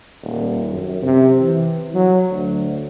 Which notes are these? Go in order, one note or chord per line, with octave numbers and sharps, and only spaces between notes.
D#1
F#2
C3
E3
F#3
D2